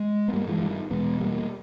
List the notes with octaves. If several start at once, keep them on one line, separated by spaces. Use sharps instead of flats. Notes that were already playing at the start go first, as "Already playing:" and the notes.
Already playing: G#3
B3
G2 G3 A#3
E3 G#3
D#3 G3
E2 B2 G#3 B3
G3 A#3